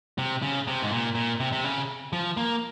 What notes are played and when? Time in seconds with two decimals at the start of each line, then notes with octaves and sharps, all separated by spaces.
0.18 C3
0.43 C#3
0.67 C3
0.82 G#2
0.91 A#2
1.15 A#2
1.40 C3
1.52 C3
1.64 C#3
2.13 F3
2.37 A#3